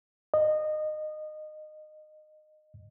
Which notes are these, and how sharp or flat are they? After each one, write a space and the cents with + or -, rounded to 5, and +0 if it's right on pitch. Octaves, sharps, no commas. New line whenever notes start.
D#5 -20